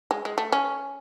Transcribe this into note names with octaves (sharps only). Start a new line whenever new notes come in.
G#3
G#3
A3
C#4